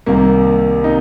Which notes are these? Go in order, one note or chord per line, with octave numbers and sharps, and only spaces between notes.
C2 C3 D#3 A#3
C3 D#4